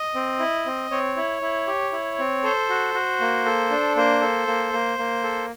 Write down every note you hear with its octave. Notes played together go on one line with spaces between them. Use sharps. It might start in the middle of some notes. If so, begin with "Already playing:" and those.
Already playing: D#5
C4
E4
C4
C4 C#5
E4
E4
G4
E4
C4
A4 C5
F#4
F#4
A#3
A4
D4
A#3 C5
A4
A#3
A#3
A#3
A4